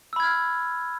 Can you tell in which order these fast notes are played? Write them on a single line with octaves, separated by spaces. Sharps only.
E6 B5 G#6 F6